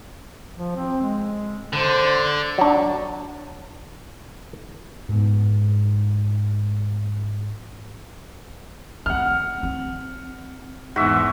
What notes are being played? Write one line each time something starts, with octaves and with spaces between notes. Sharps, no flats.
F3
C4
G#3
D3 C5
F#3 D4
G#2 B3
A3 C4 F#5 F6
C4
E2 G#2 F#4 E5